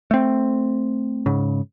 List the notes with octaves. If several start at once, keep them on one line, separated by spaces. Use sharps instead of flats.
A3 C4
G#2 C#3